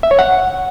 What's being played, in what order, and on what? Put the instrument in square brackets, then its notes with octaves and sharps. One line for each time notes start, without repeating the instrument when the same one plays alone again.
[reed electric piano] E5
C#5
F#5